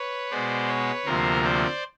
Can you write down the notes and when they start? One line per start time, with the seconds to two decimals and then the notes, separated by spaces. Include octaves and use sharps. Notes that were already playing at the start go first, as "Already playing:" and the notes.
Already playing: B4 C#5
0.31 B2 G#3 B3 C5 D5
0.68 B4 C#5
1.06 D2 C3 F3 A#3 A#4 C5
1.44 C5 D5